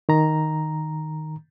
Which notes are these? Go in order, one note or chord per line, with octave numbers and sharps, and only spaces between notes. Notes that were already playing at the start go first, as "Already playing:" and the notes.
D#3 A#5